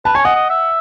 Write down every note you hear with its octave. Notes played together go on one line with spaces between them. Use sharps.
B4 A5
C#5 G#5
D#5 F#5
D#5
E5